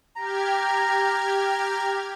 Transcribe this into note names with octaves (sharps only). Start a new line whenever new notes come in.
G4 A#5 F6 G#6